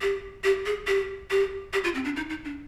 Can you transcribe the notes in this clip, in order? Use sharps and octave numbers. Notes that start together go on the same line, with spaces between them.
G4
G4
G#4
G4
G4
G4
F4
C4
D4
D#4
D#4
D4